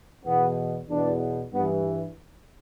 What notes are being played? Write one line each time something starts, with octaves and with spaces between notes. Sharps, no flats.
E2 B2 B3
E2 B2 D4
G2 E3 B3